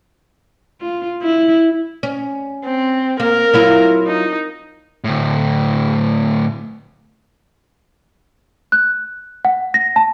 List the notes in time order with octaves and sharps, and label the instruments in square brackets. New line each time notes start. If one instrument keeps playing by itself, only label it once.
[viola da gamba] F4
E4
[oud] C#4
[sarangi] C4
[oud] A#3 [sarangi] A#4
[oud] F#3 E4 F4
[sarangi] D#4
[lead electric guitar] D2 A2
[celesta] F#6
F#5
A#6
A5